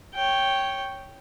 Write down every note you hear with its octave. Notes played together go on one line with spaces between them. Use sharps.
C#5 G5